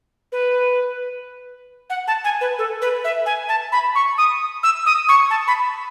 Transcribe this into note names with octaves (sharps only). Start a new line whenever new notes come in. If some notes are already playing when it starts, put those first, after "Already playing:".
B4
F#5
A5
G#5
B4
A4
B4
E5
G#5
A5
B5
C#6
D#6
E6
D#6
C#6
A5
B5